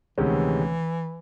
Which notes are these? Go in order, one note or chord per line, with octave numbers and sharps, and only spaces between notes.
D2 C3 D#3 E3 G#3 C#4